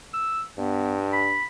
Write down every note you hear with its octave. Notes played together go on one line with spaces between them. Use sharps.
E6
G2 B3
B5